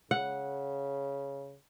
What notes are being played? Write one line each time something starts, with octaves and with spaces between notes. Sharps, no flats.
C#3 F#5